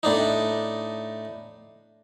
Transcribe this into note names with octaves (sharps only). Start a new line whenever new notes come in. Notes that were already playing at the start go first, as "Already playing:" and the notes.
A2 D4 D#4